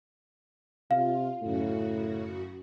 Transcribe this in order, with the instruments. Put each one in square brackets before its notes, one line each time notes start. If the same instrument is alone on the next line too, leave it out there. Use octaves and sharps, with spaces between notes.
[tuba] C3 [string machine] F4 [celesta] F5
[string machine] F#2 C#3 F#4 [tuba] A2